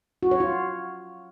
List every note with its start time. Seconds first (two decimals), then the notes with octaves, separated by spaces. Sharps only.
0.23 F#4
0.31 C#5
0.40 F4